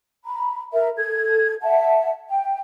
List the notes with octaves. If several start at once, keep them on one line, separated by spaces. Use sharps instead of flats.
A#5 B5
A#4 E5
A4 G#6
E5 F#5 A5
G5